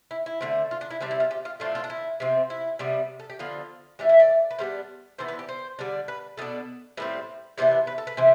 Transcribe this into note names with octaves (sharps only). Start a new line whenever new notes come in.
E4
E4
D3 A3 C4
F4
D4
E4
C3 G3 C4 D4
E4
F4
G4
F4
A2 F3 A3 D4 F4
F4
D4
E4
C3 F3 C4
E4
C3 G3 B3
A4
G4
D3 F3 B3 F4
E3 A3 D4 G4
E4
D5
B4
D3 G3 B3 D4 C5
E3 B3 D4 C5
B4
G4
C5
D3 G3 D4
B4
B2 B3 D4 A4
A2 G3 C4 B4
C3 E3 B3 D4 C5
B4
A4
B4
C3 E3 C5